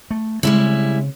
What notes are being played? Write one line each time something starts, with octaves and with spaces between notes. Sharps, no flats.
A3
C#3 G3 G#3 C4 E4